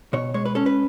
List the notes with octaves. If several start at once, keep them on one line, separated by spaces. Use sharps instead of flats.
B2 C#5
G#3 C#5
B4
C#4 A4
B4